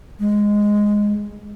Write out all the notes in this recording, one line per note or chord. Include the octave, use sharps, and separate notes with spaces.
G#3